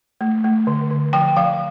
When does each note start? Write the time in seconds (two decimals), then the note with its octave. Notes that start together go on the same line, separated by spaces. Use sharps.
0.21 A3
0.44 A3
0.67 D3
0.91 D3
1.13 F3 G5
1.36 F3 F5